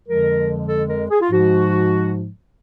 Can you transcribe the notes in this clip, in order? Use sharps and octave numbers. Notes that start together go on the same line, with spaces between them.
F2 D3 F3 G#3 A#4
A4
A#4
G#4
F4
G#2 F3 G#3 F#4